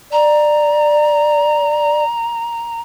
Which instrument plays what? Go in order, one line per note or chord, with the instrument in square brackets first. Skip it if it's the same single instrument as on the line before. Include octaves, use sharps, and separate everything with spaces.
[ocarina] D5 [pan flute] A#5